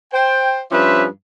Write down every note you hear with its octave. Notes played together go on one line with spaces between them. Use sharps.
C5 G5
G2 F3 C#4 B4 C5 E5